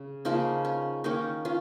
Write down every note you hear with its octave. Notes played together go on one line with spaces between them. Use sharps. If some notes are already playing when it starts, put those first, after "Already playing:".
Already playing: C#3
C#3 F3 A#3 C#4 D#4
C#4
D#3 A#3 C#4 D#4
C#4 F4